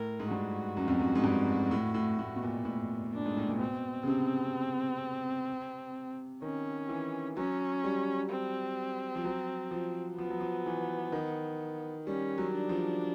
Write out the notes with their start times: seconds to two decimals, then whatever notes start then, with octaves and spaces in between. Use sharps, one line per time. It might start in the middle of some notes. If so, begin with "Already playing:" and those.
Already playing: A2 A#4
0.20 G#2
0.30 G2 F#4
0.77 F#2
0.88 F2
0.99 F#2
1.15 G#2
1.24 G2
1.71 A2
1.94 A2
2.19 A2
2.36 B2
2.43 A#2
2.65 A2
3.13 A#2 D4
3.26 G#2
3.37 A2
3.49 A#2
3.59 B2 C4
4.03 C#3
4.07 C3
6.42 D#3 C#4
6.89 E3
7.36 F#3 C#4
7.84 G3
8.30 C4
9.16 F3
9.24 F#3
9.71 F3
10.18 F3 B3
10.30 F#3
10.41 F3
10.66 E3
11.12 D#3
12.07 G3 C#4
12.38 F#3
12.54 D4
12.69 F3